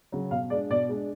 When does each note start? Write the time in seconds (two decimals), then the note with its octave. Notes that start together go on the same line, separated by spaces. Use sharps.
0.12 C#3 F#3
0.31 B2 F5
0.50 G#3 D4 D5
0.70 B2 D5
0.89 G#3 D4